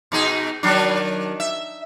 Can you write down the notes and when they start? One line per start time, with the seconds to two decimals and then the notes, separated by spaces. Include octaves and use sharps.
0.12 B2 D#4 G#4
0.63 D#3 F#3 D4
1.40 E5